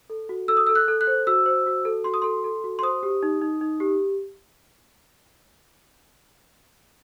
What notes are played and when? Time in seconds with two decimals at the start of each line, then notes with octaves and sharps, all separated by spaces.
0.10 A4
0.29 F#4
0.48 A4 E6
0.57 D#6
0.67 A4 E6
0.75 F#6
0.88 A4
1.01 F#6
1.07 C5
1.27 F#4 E6
1.46 C5
1.66 F#4
1.85 A4
2.04 F#4 C6
2.14 D#6
2.22 A4 C6
2.44 A4
2.64 F#4
2.79 C6
2.82 C5 D#6
3.03 G4
3.23 D#4
3.41 D#4
3.61 D#4
3.80 G4